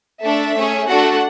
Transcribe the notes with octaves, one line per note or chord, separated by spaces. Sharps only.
A3 D4 A4 E5
A3 C#4 G#4
A3 D4 F#4 A4 F#5